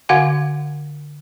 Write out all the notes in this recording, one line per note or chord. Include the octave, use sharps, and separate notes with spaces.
D3 F#4 F5 F#5 G#5